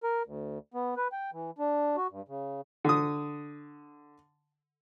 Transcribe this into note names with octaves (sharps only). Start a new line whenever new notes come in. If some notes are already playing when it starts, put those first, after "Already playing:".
A#4
D2
B3
B4
G5
E3
D4
F#4
G2
C#3
D3 D#6